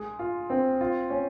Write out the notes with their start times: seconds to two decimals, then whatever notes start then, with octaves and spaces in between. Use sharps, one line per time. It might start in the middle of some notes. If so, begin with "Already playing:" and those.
Already playing: G#3 G#4
0.19 F4
0.50 C4
0.81 F4
1.10 C#4